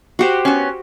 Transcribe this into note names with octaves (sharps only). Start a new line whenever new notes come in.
F#4 G4 C5
B3 C#4